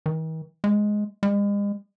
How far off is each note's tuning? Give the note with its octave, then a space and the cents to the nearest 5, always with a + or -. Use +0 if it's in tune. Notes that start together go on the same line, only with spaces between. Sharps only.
D#3 +45
G#3 +5
G#3 -40